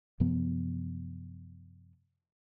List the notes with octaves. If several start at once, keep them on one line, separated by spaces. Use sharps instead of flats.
F#2 C3 F3 B3